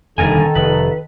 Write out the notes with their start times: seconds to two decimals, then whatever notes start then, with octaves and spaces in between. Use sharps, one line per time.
0.18 D#1 C2 F2 D3 D#3 A4 A#4 G#5
0.55 F1 B4